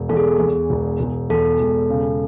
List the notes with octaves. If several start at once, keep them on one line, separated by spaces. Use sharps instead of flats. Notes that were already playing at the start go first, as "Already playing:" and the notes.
Already playing: E1
E2 A4
G#4
E2
E1
E1
E2 A4
E1
C#3